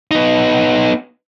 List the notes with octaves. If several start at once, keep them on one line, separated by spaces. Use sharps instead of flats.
B3 D#4